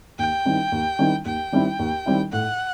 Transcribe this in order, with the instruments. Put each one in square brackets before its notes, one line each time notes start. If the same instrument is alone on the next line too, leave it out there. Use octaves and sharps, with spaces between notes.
[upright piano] D#2 [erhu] G5
[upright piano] D#3 G3 C4 E4
D#2
D#3 G3 C4 E4
[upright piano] D#2 [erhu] G5
[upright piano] D#3 G3 C4 E4
D#2
D#3 G3 C4 E4
[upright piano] A2 [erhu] F#5